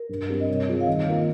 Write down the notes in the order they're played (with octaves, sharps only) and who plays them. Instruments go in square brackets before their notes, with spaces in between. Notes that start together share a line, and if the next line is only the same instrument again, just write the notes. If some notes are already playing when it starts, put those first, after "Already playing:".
Already playing: [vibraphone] A#4
[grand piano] G2
G3 C4
[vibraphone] D#5
[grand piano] C3 [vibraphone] C#5
[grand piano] G3 C4 F4 G#4
[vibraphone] F5
[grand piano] D#3 [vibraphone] D#5
[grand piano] A#3 F4 A#4